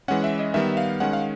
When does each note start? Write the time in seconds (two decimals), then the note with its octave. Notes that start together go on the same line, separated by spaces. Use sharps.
0.08 E3 G#3 C#4 F#5
0.24 E5
0.39 D#5
0.54 D#3 G3 B3 E5
0.77 F5
1.00 D#3 G#3 C#4 F#5
1.13 F5